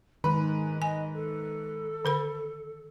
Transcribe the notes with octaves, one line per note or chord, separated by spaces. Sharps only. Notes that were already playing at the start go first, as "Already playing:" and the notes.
G#2 D#3 G#3 B4 B5
D#5 G#5
A4
D3 A#4 B5